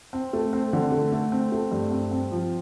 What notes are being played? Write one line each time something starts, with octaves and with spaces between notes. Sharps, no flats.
C4
A3
C4
D3
A3
A3
C4
A3
G2
C4
C4
F3